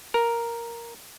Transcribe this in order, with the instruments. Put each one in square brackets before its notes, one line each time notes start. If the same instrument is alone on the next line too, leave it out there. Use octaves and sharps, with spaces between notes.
[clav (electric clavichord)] A#4